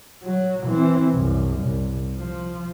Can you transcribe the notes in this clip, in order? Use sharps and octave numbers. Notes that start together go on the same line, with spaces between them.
F#3
E3 C4
C2 F#2
C2
F3